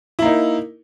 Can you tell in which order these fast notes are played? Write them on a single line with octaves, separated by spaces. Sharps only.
E4 A#3 D#4